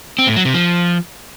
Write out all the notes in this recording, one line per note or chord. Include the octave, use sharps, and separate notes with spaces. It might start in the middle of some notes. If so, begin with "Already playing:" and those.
C4
A2
F#3
C3
F3